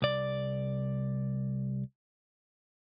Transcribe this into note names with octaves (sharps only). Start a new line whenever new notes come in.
C2 D5